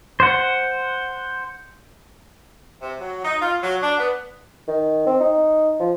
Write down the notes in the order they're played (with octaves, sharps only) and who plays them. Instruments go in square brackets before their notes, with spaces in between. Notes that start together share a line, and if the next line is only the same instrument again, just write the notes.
[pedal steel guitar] C5 F#5
[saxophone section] C3
F#3
D#4
F4
F#3
D4
B3
[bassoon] D#3
C4
D#4
F3